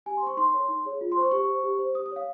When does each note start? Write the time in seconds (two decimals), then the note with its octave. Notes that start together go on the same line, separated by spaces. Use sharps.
0.06 G4 G#5
0.17 C6
0.22 C5 C#6
0.37 D#4 C6
0.54 A#4 C#5
0.69 D#4
0.85 G#4 C#5
1.01 F4
1.12 C6
1.17 C5 C#6
1.31 G4 C#6
1.48 C5
1.63 G4
1.79 C5
1.95 G4 D#6
2.06 D#6
2.11 C#5 F5